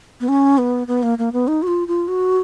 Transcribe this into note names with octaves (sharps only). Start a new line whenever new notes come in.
B3
C#4
B3
B3
A#3
A#3
B3
D#4
F#4
F4
F4
F#4